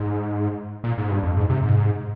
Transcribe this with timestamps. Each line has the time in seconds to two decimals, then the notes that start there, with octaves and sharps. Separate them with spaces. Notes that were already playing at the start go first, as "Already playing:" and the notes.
Already playing: G#2
0.84 A#2
0.98 G#2
1.10 G2
1.23 F2
1.37 G#2
1.50 C3
1.63 G#2